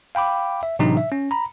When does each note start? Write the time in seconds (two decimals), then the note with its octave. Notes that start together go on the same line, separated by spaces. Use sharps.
0.15 F5 G5 B5 D6
0.63 E5
0.79 A2 C3 E3 F#3 D4 D#4
0.97 E5
1.12 C#4
1.31 A#5 B5